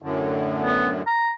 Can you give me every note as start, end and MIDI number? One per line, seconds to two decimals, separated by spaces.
0.02 1.02 42
0.02 1.02 45
0.02 1.02 50
0.63 0.89 59
1.07 1.31 82